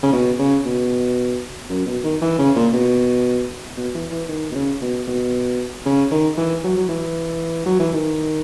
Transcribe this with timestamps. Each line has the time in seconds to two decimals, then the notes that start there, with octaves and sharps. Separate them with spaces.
0.03 C#3
0.13 B2
0.39 C#3
0.66 B2
1.69 F#2
1.86 B2
2.04 D#3
2.21 E3
2.39 C#3
2.56 A#2
2.73 B2
3.77 B2
3.94 E3
4.12 E3
4.29 D#3
4.51 B2
4.55 C#3
4.82 B2
5.07 B2
5.86 C#3
6.12 D#3
6.38 E3
6.64 F#3
6.77 F#3
6.89 E3
7.66 F#3
7.79 E3
7.93 D#3